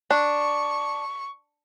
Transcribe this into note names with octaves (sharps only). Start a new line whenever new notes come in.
D4 C#6